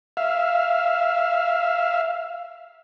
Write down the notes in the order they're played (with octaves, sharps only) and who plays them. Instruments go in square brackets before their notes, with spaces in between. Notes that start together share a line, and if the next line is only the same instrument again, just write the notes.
[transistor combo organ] E5 F5